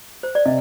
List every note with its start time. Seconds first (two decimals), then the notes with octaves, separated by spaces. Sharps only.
0.23 C5
0.35 D5
0.46 C3 D#5